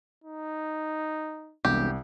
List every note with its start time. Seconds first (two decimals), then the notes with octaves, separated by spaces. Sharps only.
0.24 D#4
1.65 E1 C2 G4